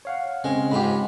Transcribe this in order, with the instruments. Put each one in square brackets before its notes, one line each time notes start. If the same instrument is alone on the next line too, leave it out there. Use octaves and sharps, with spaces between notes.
[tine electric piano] C#5 F5 F#5
[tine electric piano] C#3 C4 C#4 [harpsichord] G#3
[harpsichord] G#2 F4 [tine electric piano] G4 B5